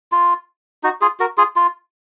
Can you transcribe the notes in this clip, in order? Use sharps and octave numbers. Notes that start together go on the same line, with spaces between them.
F4
D#4 F#4
F4 G#4
F#4 A#4
F4 G#4
F4